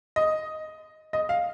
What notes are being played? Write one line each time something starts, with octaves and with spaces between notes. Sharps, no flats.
D#5
D#5
F5